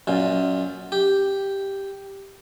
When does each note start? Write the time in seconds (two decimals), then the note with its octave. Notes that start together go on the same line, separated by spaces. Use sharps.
0.07 F#2 A#2
0.92 G4